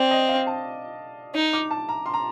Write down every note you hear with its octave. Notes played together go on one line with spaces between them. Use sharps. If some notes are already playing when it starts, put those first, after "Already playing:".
Already playing: C4 D5
D#5
F5
A5
D#4
D6
A5
A#5
C6
A#5